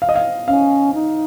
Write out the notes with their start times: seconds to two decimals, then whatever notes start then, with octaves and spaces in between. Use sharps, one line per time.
0.02 F5
0.09 D#5
0.16 F5
0.48 C#4 F5
0.94 D#4